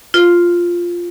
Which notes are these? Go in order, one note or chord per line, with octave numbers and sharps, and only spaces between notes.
F4